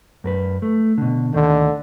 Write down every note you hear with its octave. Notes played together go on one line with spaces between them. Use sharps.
F#2 A#4 B4
A3
B2 D3
D2 D3 D#3